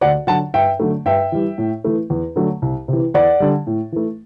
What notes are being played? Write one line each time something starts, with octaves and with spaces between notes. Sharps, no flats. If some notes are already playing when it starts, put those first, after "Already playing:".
D2 D5 F#5
D3 F#3 F#5 A5
G2 E5 G5
D3 F#3 A3
G2 E5 G5
E3 G3
A2
E3 A3
E2
D3 F#3 A3
C2
C3 E3
E2 D5 F#5
D3 G3
A2
E3 A3